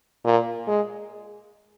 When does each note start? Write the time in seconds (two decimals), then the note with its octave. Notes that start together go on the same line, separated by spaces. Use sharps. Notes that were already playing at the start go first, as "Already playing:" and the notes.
0.25 A#2
0.68 G#3